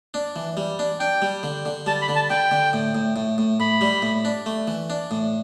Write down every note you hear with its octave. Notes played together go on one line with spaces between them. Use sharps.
D4
E3
G3
D4
D4 G5
G3
D3
D3
G3 A5
B5
D3
A5
D3 G5
D3
A2
A2
A2
A2
A2 B5
G3
A2
D4
A3
E3
D4
A2